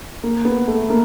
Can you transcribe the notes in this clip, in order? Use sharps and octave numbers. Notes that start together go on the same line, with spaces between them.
A#3
B3
A3
A#3